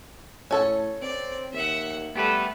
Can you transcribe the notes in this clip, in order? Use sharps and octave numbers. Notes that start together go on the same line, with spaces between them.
A2 C#4 A4 C#5
C4 D5
D#2 E5 F#5
G3 A3 B3 G4 B4